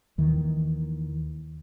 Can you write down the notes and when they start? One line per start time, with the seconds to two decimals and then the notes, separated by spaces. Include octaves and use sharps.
0.18 D#2 D#3 E3